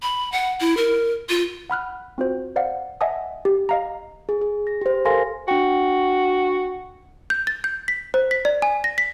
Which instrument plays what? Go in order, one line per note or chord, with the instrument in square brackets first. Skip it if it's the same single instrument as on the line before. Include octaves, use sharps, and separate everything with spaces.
[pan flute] B5
F#5
E4
A#4
F4
[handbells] F#5 B5 F6 F#6
C4 F4 F#4 C5
C5 D5 F5 F#5
D#5 E5 F#5 G#5 A5 D#6
G4
D#5 F5 A#5
[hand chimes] G#4
G#4
A#6
G4 C5
A4 A#4 F5 G#5 C6 A#6
[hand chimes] D4 G5 [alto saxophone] F#4
[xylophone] G6
A6
G6
B6
C5
B6
D5
G#5
A#6
B6